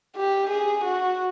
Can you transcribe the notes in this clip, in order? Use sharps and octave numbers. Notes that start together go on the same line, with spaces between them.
G4
G#4
F#4